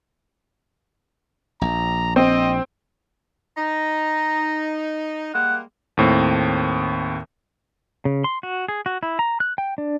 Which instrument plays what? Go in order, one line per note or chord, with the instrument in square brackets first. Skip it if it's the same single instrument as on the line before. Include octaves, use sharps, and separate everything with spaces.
[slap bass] A#1 [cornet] A#5
[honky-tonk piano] C4 [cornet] D#5
[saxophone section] D#4 [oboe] A#5
[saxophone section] G3 G#3 A#3 [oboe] F#5
[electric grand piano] D#2 A2 C4
[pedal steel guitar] C#3
C6
F#4
G#4
F#4
E4
A#5
F#6
G5
D4